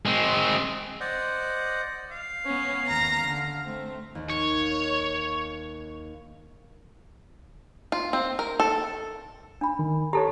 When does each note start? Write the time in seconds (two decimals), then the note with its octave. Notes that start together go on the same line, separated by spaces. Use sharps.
0.06 G#3 C4
1.00 C5 D5 D#5 F#5
2.11 F5
2.44 B3 C#4
2.86 D#2 A#5 A#6
3.22 D3
3.61 A3 C4
4.15 D#2
4.30 C#5
7.92 F4
8.13 C4
8.39 A#4
8.60 A4
9.61 D4 B5
9.79 D#3
10.13 G4 A4 C#5 A5 A#5